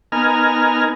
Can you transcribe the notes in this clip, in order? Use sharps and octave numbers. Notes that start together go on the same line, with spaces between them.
B3 D#4 A#4 G#5 F6